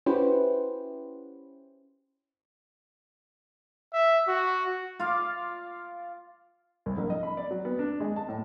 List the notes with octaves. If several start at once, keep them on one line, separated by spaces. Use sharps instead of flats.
C#4 E4 F#4 G4 B4 C5
E5
F#4
F4 D5 F5
C2
A#1
D#5
B5
D5
F#3
B3
D4
G#3
A5
A2